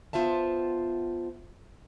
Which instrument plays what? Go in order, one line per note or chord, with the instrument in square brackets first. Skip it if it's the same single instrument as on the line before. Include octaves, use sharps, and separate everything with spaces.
[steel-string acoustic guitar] B3 F4 C5 E5 A5